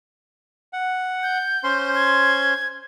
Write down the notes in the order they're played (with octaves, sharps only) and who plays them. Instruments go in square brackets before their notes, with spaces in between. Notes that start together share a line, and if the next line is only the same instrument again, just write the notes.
[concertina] F#5
[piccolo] G6
[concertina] C#4 C5 C6
[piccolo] G#6